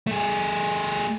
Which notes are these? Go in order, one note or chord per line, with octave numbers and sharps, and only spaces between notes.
A3 G#4